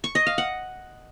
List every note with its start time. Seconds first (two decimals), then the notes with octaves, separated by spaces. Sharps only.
0.04 C#6
0.15 D#5
0.27 F5
0.38 F#5